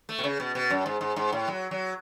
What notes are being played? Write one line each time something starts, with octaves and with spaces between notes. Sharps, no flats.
A3
B2
C#3
B2
B2
F#2
G#2
G#2
G#2
A2
F#3
F#3